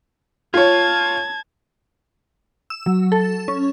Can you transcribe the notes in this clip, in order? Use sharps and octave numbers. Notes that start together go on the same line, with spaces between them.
F4 C#5 A5 G#6
E6
F#3
A4
C#4